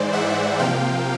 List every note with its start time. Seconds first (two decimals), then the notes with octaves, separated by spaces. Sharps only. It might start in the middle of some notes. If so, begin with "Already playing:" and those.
Already playing: G#2 E3 G#3 C5 D5
0.12 E5 F#5
0.59 C3 F3 A#3 F5 G5